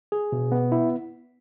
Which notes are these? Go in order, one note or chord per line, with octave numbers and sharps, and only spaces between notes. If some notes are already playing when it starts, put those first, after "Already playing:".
G#4
B2
B3
E4